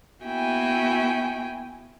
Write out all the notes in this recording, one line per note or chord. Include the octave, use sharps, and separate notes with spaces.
A#3 B3 E4 F#4 G5 G#5